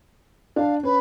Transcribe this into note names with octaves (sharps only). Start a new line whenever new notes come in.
D4 F5 A5
C#4 B4